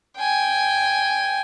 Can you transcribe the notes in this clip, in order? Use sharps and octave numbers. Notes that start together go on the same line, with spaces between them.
G5 G#5